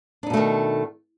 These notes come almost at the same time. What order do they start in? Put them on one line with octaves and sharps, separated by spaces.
D4 D#4 B2 A3 D#3